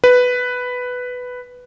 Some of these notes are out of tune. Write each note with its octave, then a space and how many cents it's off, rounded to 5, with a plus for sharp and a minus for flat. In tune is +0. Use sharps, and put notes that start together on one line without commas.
B4 +5